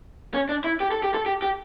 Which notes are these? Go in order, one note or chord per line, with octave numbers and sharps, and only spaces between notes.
C#4
D4
E4
G4
A4
G4
A4
G4
G4